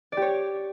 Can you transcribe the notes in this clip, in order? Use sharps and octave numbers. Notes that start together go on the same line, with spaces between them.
G4 C#5 D5